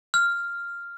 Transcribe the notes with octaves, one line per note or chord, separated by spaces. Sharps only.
F6